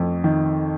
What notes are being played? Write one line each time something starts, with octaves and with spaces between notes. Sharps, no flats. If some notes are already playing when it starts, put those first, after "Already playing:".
Already playing: F2 A3
D#3